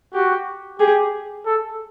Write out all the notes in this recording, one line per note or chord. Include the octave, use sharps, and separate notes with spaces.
F#4 G4
G4 G#4
A4